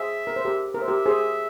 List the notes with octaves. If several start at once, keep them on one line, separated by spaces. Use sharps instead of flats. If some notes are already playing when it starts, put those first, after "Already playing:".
Already playing: G#4 C5 E5
A#4
C5
G4 A#4
A#4 E5
C5
G4 A#4
G#4 C5